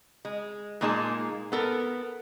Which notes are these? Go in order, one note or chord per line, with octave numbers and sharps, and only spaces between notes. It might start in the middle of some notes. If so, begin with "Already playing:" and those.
G#3
A#2 G#3 A#3 D#4 G#4 A5
B3 A4 A#4